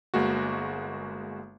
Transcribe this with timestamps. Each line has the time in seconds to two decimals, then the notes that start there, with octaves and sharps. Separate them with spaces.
0.14 G1 G#3 A#3 F#4